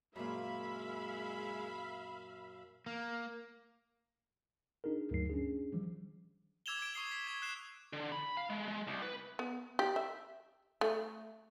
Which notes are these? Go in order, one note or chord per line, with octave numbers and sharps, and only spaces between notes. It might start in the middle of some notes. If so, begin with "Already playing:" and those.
F#2 A#2 G#3 E5 F5 B5
A#3
D4 D#4 G#4 A#4
D2 G2 F#3 C7
C#4 D4 G#4
D#3 F3 G3
D6 E6 G#6 E7 F7 G7
D6 E6 G#6 D7 G7
C#6 D#6 C7 G7
B6
G#6
F#6 C7 E7
D3
B5
F5
G#3
G#3
C2
B4
B3
G4
E5
A3